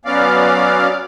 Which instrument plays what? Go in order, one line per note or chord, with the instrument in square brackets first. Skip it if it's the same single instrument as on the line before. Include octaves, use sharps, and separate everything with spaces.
[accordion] F#3 B3 C#4 D5 F5